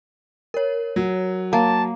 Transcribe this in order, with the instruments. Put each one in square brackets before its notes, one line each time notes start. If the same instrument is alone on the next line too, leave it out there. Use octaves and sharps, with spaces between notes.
[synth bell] A#4 C#5
[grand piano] F#3
[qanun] A#3 [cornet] A5